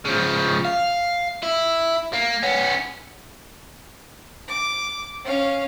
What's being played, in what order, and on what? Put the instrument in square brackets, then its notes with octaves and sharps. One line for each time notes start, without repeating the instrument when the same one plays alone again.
[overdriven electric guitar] C#3 F3
F5
E4
A#3
B3 C#4
[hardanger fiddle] D6
C#4 F5